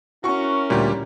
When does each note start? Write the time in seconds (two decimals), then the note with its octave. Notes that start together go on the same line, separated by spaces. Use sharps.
0.24 C#4 E4 F#4 A#4 C#6
0.70 D2 A#2 G3 G4